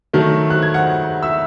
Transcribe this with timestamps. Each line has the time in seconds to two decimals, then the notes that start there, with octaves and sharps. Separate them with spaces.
0.13 D#3 F#3 A3
0.50 F#6
0.62 G#6
0.74 F#5 F#6
1.23 E5 E6